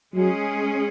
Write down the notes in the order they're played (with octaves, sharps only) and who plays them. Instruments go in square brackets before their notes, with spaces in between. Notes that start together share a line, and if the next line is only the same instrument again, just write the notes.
[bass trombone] F#3 [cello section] G#3 C#4 G#4